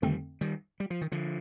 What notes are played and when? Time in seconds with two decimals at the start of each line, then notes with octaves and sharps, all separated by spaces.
0.02 F2 D3 D#3 G3 A3 C4
0.41 D#3 G3
0.80 G3
0.90 F3
1.01 D#3
1.12 D3 F3